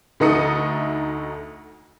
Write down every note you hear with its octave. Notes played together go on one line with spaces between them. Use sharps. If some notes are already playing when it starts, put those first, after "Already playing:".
D2 A3 D#4 D#6 C#7